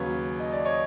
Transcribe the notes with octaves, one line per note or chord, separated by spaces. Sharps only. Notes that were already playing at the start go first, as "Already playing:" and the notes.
Already playing: D#2 C#3 F#3 B4 C#5
D#5
D5
C#5 D#5